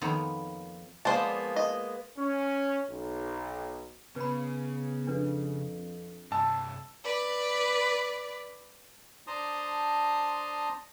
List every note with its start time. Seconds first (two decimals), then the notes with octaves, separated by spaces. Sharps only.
0.01 F2 D#3 A#3 B3 C#5 A#5
1.05 F3 G#3 A#3 B3 C5 D5 A5
1.56 D#5
2.17 C#4
2.90 B1
4.16 C#3 B3 B4 B5
5.07 F2 D4 B4
6.32 G2 C3 A5 E6
7.04 B4 D5
9.27 D4 C5 A5 A#5 C6 D#6